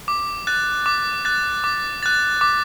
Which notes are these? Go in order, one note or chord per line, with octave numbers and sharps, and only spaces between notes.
D6
F#6 A6
D6
F#6 A6
D6
F#6 A6
D6